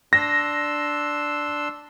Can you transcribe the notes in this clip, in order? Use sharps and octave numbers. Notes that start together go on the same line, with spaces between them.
D4 C6 E6 A#6